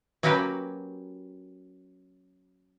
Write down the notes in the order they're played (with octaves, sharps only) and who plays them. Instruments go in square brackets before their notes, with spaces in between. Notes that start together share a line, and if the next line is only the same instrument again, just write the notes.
[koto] F#3 A#3 C#4 F#4 G4 B4